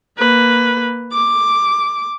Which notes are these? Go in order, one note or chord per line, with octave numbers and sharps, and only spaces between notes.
A#3 B4
D6